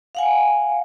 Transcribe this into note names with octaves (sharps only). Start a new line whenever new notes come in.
F5 F#5 G#5